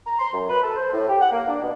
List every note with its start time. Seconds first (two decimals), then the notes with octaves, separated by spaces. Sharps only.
0.05 A#5
0.18 C6
0.32 F#2
0.48 B4
0.62 A4
0.76 C5
0.92 A2
1.07 G4
1.20 F#5
1.31 A#3
1.47 D4
1.61 B2